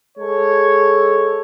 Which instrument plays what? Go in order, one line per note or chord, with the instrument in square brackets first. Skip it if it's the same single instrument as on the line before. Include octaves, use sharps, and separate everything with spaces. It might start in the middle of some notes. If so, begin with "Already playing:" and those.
[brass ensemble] G#3 A4 C#5